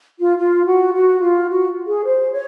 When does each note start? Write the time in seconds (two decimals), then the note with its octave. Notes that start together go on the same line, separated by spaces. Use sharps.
0.19 F4
0.38 F4
0.66 F#4
0.94 F#4
1.21 F4
1.49 F#4
1.87 G#4
2.04 C5
2.32 C#5